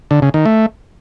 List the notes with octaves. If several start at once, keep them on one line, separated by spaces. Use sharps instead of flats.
D3
C#3
D#3
A3